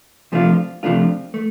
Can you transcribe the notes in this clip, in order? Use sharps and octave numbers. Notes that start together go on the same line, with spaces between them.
C3 F3 A3 D4 F4
C3 F3 A3 D4 F4
A3